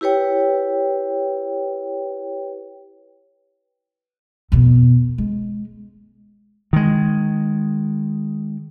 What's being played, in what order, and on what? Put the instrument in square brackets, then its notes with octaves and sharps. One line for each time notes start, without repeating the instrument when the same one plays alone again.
[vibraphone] E4 G4 B4 C#5 G5
[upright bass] F2 B2
G#3
[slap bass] D#3 G#3